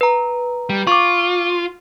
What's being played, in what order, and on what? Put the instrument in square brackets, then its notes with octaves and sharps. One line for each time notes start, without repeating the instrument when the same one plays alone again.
[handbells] B4 A#5
[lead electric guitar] G3
[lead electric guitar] F4 [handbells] C#6 D6